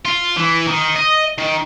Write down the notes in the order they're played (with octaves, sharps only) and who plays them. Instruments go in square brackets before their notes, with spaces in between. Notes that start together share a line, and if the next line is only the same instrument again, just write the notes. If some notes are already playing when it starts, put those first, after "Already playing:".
[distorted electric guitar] F4
E3
D#3
D#5
D#3